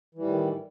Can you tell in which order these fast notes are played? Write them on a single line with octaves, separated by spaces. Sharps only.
E3 G3 A2 D#3